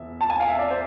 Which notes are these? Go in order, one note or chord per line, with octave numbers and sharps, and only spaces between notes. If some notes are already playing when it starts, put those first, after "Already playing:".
Already playing: E1 E5
A5
G#5
F5
E5
D5
C5